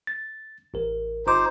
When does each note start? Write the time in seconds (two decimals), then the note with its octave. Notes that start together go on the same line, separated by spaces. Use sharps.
0.07 A6
0.74 A1 A#4
1.27 G1 D#4 C5 D6